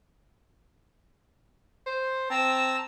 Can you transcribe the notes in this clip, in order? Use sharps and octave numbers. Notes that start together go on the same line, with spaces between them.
C5
C4 A5 A#5 E6